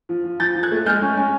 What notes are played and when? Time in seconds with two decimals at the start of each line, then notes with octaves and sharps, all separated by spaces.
0.09 F3
0.24 F3
0.40 F3 G6 A6
0.56 F3
0.63 F#6 G#6
0.71 A3
0.86 G#3 F6 G6
1.02 C#4
1.17 C#4